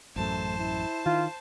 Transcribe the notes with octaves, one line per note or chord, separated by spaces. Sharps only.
A1 F#2 A3 C5 A5
E4
D#3 F4